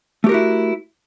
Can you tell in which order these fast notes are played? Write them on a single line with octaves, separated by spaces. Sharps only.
A3 G4 A#4 F#4 E4